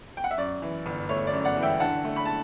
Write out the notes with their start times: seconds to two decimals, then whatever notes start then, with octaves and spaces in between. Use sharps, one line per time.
0.17 G5
0.24 F#5
0.31 E5
0.38 F#2 D5
0.62 E3
0.86 G1
1.09 A3 C#5
1.27 D5
1.33 F#2
1.44 D5 F#5
1.57 E3
1.63 E5 G5
1.80 D3 F#5 A5
2.05 A3
2.16 B5
2.25 A5